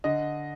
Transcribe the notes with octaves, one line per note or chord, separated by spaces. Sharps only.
D3 D#5